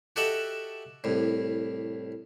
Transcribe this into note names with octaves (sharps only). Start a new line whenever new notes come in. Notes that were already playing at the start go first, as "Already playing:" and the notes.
F#4 G4 A4 D#5 E5 F#5
C2 A2